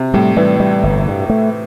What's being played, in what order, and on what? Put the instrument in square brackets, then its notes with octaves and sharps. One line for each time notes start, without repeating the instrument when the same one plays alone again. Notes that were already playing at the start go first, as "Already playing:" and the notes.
Already playing: [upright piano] C3
[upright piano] A2 [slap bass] G3
[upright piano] E3 [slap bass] G3
[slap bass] G3
G1
G2
A3